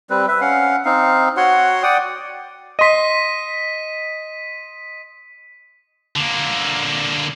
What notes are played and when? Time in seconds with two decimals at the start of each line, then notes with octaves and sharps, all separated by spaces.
0.10 G3 C4 B4
0.28 B4 E5
0.41 C#4 F5 F#5
0.85 C4 D#4 F5
1.37 F#4 C#5 F#5 C6
1.83 D5 F#5 G5 D#6
2.79 D#5 C6 B6 D#7
6.16 D3 A#3